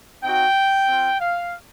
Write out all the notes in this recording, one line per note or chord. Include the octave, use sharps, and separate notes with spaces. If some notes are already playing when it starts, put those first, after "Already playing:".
C4 D#4 F#4 G5
C4 F4
F5